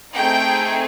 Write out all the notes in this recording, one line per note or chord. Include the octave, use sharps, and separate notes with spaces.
A3 C4 D#4 G#4 G5